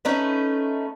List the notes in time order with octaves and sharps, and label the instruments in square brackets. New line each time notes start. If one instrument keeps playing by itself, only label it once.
[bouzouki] A3 C#4 D#4 B4